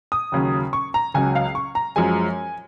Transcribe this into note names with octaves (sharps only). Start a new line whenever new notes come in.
D#6
D#2 C#3 F#3
C#6
A#5
C#2 C#3 F#3 G#5
F5
C#6
A#5
F#2 F3 G#3 G#5